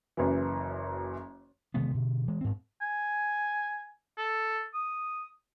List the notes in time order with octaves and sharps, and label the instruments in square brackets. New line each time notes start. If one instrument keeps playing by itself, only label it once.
[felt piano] F#1 F#2 E3
[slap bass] C3 D#3 G#3 B3
B2 D3
E3 G#3
G#2 C4
[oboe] G#5
A4
D#6